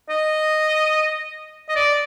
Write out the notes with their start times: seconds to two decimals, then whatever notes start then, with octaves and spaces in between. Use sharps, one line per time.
0.09 D#5
1.69 D#5
1.75 D5